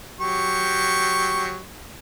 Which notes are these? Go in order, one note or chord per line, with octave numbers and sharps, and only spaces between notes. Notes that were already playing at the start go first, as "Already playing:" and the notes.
F#3 G4 C#6